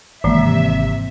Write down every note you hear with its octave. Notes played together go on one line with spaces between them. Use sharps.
G#1 C3 E3 A#3 E5